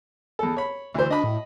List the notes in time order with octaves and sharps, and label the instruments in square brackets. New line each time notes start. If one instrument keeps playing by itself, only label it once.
[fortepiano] E2 A4
C#5 B5
[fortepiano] D2 C5 [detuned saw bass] E3
[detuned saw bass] D4 [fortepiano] D#5 B5
[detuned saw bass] A2